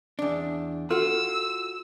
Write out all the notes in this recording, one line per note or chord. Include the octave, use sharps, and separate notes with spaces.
E2 D4
F4 F#4 A4 E6